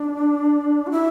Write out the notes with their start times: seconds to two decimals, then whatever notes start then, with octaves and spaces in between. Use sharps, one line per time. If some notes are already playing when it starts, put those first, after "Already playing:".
Already playing: D4
0.87 F#4
0.91 E4